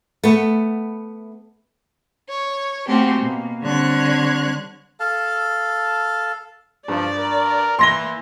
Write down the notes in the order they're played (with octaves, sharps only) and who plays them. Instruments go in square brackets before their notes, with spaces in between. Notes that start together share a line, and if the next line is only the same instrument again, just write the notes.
[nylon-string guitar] A3 B3
[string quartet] C#5
A3 A#3 C4 C#4 F#4 G4
B2 A#3
D3 G3 C4 C#5 F#6 G#6
[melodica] A4 F5 A5
[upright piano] G2 [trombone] F3 [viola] D5
[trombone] A#4
[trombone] E3 [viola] A#3 [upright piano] C6 A#6 G7